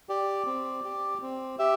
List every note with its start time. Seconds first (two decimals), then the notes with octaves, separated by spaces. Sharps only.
0.09 G4 D5
0.46 C4
0.84 G4
1.22 C4
1.59 G4 E5